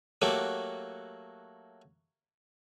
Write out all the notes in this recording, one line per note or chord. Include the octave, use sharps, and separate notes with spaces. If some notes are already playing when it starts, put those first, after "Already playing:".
F#3 A3 A#3 F#4 G4